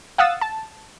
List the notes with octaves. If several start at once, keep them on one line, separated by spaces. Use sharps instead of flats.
F5 F#5 D#6 E6 A6
A5